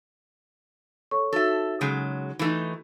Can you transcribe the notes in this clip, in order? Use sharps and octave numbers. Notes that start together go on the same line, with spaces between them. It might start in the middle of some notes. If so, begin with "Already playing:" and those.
A4 C#5 C#6
D#4 F#4 A4 E5
C#3 F#3 G#3
E3 A3 D#4